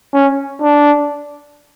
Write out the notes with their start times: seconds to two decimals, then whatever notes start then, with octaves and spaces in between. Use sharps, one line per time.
0.14 C#4
0.62 D4